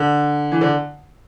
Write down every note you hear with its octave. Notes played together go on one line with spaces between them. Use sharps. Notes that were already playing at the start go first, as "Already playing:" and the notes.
Already playing: D3
E3
D3